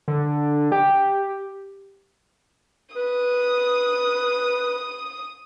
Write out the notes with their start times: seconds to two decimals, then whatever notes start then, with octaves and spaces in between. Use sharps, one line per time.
0.08 D3
0.72 G4
2.96 B4 D#6